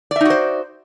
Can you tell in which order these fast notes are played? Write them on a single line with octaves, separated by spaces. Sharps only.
D5 E5 D#4 F#4 C5